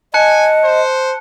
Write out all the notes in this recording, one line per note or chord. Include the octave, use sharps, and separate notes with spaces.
D#5 G#5 A5 F#6 C#7
C5